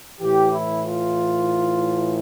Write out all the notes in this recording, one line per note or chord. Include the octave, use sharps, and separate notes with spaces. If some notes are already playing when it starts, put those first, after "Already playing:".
A2 E3 G4
E4
F4